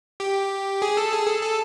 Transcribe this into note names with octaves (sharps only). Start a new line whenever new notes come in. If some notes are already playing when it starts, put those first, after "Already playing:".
G4
G#4
A4
G#4
A4
A4